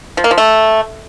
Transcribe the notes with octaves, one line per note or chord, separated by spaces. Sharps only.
F3
A#3
F3
A3